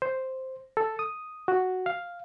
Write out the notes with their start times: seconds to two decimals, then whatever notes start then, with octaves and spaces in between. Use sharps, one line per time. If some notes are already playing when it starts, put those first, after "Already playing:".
0.02 C5
0.77 A4
0.99 D#6
1.48 F#4
1.86 F5